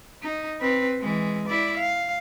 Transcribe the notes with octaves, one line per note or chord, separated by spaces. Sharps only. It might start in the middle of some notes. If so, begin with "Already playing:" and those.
D#4
C4 B4
E3 G#3
E4 D5
F5